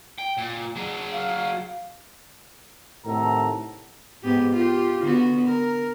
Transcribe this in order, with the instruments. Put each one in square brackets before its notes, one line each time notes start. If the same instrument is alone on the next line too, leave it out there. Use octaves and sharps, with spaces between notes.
[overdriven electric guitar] G5
A#2
F#3 G#4
[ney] F5
[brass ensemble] A2 C3 D#3 A4 F#5 A#5
[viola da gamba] G#2 B3 G4
F4 G4
D3 B3 F#4
A#4